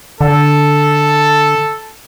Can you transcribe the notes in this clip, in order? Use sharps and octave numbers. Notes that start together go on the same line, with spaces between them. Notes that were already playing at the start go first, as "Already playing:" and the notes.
D3 A4